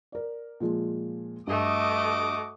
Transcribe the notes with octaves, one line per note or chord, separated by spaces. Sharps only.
A#4 D5
A#2 F3 G#3
G2 A3 F#4 D#5 D6 D#6